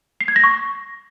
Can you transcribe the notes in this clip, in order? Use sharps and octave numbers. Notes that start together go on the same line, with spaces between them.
C7
G#6
A#6
C#6